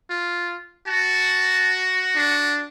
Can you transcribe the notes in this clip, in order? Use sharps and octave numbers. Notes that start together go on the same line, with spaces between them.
F4
F#4 A5
D4